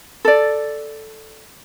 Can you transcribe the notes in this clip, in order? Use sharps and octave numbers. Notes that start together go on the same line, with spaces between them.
A4 D5